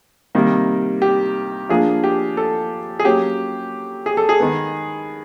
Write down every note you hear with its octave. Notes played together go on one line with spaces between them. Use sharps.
C3 D#3 G3 A#3
G4
F3 A#3 D4 F4 G#4
G4
A4
G#4
F#3 A#3 C#4 G4
G#4
A4
G#4
D#3 G#3 B3